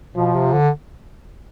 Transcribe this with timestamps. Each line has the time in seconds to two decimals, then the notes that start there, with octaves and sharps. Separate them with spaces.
0.15 B2 F3
0.34 C3
0.53 D3